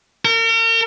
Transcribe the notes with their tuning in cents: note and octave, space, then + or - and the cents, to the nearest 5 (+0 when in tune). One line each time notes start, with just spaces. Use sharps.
A#4 -40